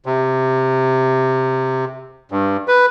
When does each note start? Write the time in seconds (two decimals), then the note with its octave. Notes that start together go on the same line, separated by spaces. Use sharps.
0.06 C3
2.31 G2
2.68 B4